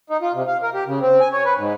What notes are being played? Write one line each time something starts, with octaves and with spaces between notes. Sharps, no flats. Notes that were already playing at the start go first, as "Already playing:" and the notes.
D#4
F4
C3
F5
A#4
G4
C#3
C4
G#5
C#5
B4
G#2